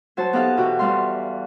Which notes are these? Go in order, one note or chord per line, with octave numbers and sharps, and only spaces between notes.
F#3 F#4 C5 A5
B3 D#4 G4 A4 F5 F#6
B2 E3 F#4 G4
E2 E3 G3 F5 C6